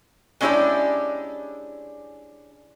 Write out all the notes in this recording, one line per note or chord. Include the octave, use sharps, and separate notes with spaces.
G#3 C#4 D4 E4 G4 D5